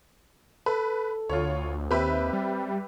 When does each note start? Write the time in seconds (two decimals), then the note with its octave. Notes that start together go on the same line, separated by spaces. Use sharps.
0.66 A4 B4
1.29 D2 F4 C#5
1.91 D#2 C4 G4 B4 E5
2.33 G3